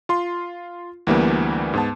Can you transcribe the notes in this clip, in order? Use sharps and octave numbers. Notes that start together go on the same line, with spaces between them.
F4 C6
D2 E3 G3 A#3 B3
G#2 B3 A5